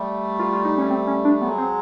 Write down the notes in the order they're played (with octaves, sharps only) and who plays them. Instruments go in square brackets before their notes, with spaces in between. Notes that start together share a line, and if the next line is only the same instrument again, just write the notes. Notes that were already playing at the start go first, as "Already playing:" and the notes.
Already playing: [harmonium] G3 A3
[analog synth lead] F4
F4
D#4
C#4
C4
C#4
D4
[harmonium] F#3 G#3 [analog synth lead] B3
[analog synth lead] C4